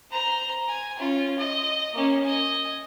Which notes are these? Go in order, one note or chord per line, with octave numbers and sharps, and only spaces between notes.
C5 A#5
G#5
C#4 F4
D#5
A#3 C#4
D#5 G#5